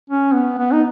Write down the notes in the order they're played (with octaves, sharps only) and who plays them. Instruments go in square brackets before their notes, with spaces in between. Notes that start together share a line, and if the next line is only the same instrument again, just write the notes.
[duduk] C#4
B3
B3
D#4